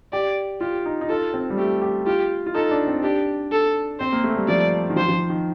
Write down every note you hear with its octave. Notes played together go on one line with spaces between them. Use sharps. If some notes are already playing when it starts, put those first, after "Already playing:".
G4 D5
F4 G4
D#4
D#4
F4 A4
C4
G3
A3 G4
G4
F4 G4
F4
D#4 A4
D4
C4
D4 G4
A4
C4 C5
A#3
A3
G3
F3 D5
D#3
F3 C5
F3
D#3
D#3